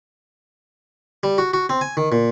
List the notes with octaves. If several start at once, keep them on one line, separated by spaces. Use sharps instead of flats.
G3
F#4
F#4
C4
G#5
D#3
A#2